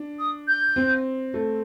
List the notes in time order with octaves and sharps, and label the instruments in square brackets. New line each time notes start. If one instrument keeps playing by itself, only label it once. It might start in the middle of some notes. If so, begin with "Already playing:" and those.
Already playing: [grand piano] D4
[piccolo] D#6
G6
[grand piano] C4
A3